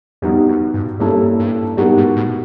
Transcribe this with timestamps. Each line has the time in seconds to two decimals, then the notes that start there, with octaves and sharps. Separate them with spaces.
0.22 F2 G3 B3 D#4 F#4
0.48 F#2
0.74 G2
1.00 G2 G3 A#3 C#4 E4 A4
1.39 G2
1.77 G2 G3 B3 D#4 F#4 A#4
1.97 G#2
2.16 A2